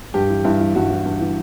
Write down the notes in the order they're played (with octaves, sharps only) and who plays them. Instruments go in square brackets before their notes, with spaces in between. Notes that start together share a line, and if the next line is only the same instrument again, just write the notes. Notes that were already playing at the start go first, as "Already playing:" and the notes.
[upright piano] G2 G4
E3
G2 E4
E3
G2 F#4
E3
G2
E3